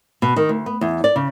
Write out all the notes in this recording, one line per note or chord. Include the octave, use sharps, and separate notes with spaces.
B2
D#3
D2
B3
E2
D5
C#3